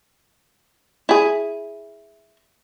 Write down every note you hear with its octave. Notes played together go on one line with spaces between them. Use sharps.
E4 G#4